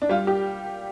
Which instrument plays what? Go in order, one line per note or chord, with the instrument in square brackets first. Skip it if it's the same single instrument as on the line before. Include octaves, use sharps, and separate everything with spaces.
[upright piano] D4
G3 F4
G4